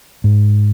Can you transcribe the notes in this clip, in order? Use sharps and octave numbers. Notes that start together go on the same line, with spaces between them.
G#2